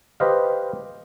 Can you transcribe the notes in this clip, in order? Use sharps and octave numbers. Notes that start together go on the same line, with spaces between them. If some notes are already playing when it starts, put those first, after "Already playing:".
G4 B4 C5 D#5 F5